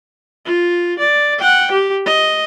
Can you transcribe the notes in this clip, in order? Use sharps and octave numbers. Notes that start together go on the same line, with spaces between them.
F4
D5
F#5 G5
G4
D#5